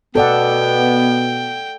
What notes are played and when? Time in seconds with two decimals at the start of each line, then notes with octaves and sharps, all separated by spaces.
0.15 B2 B3 A4 D5 F#5 G5